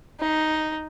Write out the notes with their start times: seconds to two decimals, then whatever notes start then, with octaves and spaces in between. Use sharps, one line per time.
0.20 D#4